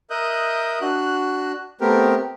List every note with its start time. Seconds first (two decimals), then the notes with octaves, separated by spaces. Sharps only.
0.10 A#4 D#5 E5 D#6 F#6 G6
0.81 D4 F#4 F#6
1.81 A3 B3 C4 G4 A#4